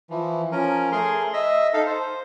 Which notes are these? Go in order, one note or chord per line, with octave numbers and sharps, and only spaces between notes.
E3 F3
F3 C#4 A#4
A3 G#4 A#4 C6
D#5 E5
D#4 A4 F5
C5